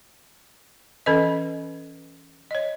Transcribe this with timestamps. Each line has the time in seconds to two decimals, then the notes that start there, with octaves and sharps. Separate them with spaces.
1.06 E3 C#4 A4 B4 D#5
2.51 C#5 D#5